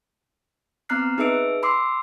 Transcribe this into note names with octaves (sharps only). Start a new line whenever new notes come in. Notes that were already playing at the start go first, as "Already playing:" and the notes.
B3 C4 A#5 F6 F#6 C7
D#4 G#4 B4 E5 E6 D7
B5 C6 D6 E6 C7